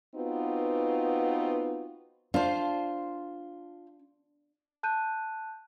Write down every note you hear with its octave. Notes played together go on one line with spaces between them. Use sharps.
B3 C4 D#4 F4 F#4 B4
D4 F4 C5
A5 F#6 G6 D#7